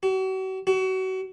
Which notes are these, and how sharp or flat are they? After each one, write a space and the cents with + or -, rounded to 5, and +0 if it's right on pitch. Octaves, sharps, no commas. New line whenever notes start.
F#4 +40
F#4 +30